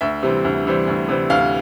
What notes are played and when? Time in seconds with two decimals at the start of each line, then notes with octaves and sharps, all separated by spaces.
0.01 D2 E5
0.23 C3 E3 G3 C4
0.45 D2
0.66 C3 E3 G3 C4
0.87 D2
1.09 C3 E3 G3 C4
1.30 D2 F5